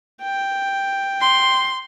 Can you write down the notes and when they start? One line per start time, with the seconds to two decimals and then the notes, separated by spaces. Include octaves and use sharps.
0.22 G5
1.21 C6